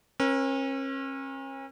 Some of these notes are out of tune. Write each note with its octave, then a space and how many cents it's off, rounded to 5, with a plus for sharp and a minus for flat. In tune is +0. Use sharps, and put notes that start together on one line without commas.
C#4 -40 A#4 +35